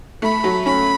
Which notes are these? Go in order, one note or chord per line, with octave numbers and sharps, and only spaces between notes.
A3 B5
F#3
C#4 B5